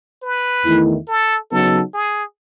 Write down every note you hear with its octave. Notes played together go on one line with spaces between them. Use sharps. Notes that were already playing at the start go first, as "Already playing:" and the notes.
B4
E2 D#3 A3 E4
A4
C#3 F#3 B3 D#4 A4
G#4